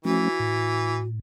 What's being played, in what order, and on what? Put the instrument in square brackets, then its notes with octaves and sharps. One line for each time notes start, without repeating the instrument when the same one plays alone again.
[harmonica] E3 [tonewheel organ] F3 A3 C#4 [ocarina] F#4
[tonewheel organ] A2